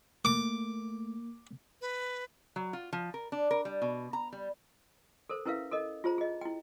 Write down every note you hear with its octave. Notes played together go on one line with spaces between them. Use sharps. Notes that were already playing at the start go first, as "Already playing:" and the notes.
A3 A#3 D6
B4
F#3
F4
F3
A#4
D4
A#4
G3
B2
A#5
G3
A4 A#4 C5
C#4 E4 A#4 B4 E5 F5
A4 A#4 D#5
F4 G#4 C5 A#5
G#4 D#5
E4 G5